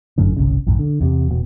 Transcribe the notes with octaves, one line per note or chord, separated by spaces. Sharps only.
G1 F#2 A2 D3
G1 C2 C#3
A#1 E2 G#2
D3
E2 C3
E1 B2